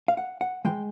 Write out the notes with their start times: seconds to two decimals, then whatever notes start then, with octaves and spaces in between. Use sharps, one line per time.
0.08 F5
0.17 F#5
0.41 F#5
0.65 E3 G#3 G5